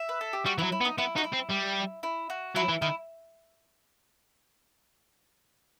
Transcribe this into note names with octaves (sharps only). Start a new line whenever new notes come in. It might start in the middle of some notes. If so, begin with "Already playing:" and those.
Already playing: E5
B4
A4
G4
G3 F#4
E3 F#3 E4
E4
B3
D#4
B3 E4
D#4 F#4
E4
C4
G3
E4
F#4
F#3 E4
E3
D#3 E4